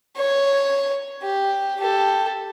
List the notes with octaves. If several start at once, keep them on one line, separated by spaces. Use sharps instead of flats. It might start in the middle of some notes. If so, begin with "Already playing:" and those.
C#5
G4
G4 A4